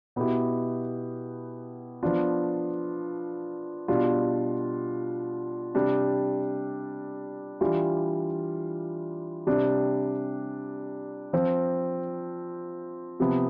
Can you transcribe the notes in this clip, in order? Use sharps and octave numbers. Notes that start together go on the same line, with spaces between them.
B2 B3 E4 G4
F3 B3 D4 F4
B2 G3 D4 F4
C3 G3 D4
E3 G3 D4 F4
C3 G3 D4
F3 C4 F4
C3 F3 B3